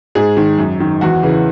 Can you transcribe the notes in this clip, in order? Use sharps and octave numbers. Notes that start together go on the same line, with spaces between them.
G#2 G#4
D#3
F#2
D#3
E2 F#4
C#3 E3